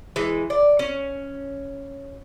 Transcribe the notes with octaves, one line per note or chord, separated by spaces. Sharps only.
E3 G#3
D5
C#4